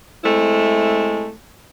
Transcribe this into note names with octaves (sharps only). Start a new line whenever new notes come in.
G#3 A3 C4 E4